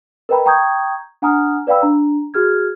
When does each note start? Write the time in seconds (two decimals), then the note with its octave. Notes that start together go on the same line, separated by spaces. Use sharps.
0.29 A#4 B4 D#5 G5 A#5 B5
0.46 G5 A#5 C#6 D#6 G6 G#6
1.22 D4 F#5 G#5 A#5 D#6 F6
1.67 B4 D5 F5 G5 B5 E6
1.82 D4 A#5
2.34 F#4 G#4 F6 G#6